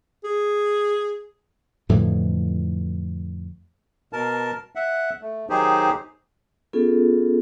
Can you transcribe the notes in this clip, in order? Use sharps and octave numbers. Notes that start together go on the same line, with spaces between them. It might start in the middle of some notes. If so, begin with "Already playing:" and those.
G#4
F2 A2 D3 E3
B2 A#4 A5
E5 F#5
A3
D#3 F#3 D#4 G4 G#4 C5
B3 C#4 F4 G#4 A4